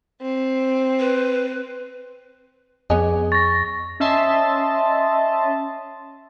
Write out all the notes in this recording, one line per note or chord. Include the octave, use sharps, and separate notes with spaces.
C4
B4
F2 B3 C#4 G#4 D#5 G#5
C#6 A6 A#6
C#4 D#5 E5 A5 C6